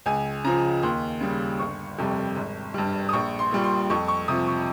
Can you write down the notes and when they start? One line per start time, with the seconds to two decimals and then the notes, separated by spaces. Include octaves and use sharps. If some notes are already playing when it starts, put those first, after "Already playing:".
0.06 C#2 G#5
0.44 C#3 F3 A#5
0.83 D#2 C6
1.21 C#3 G3
1.59 G1 C#6
1.98 F2 C3 G3
2.37 G#1
2.74 G2 G3
3.09 D#6
3.13 A#1 C#6
3.39 C6
3.51 A#2 G3
3.64 C6
3.90 F2 C#6
4.08 C#6
4.28 C3 F3 D#6
4.47 C#6